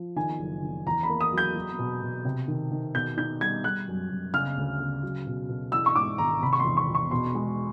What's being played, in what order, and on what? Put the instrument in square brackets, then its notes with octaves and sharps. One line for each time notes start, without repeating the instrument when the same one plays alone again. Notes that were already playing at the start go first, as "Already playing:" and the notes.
Already playing: [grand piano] F3
[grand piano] D#3 [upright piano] G#5
[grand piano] F#1
D#3
[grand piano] E2 [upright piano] A#5
[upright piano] B5
[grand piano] A#3
[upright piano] D#6
[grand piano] F#3 [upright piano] G6
[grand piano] F#3
B2
B2
C3
D#3
D#3
[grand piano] B2 [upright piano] G6
[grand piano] D#4 [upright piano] G6
[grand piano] G3 [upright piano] G#6
[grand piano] G3 [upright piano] F#6
[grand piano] F#2
F#2
[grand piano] C#3 [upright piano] F6
[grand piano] D2
C#3
F#3
B2
B2
[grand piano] E3 [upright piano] E6
[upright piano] C#6
[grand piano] G#2 [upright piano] D6
[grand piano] G#1 [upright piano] A#5
[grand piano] C3 [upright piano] B5
[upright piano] C#6
C6
[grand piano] E2
[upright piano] C#6
[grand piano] E2
[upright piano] C#6
[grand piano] B2 [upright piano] C6
[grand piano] G#3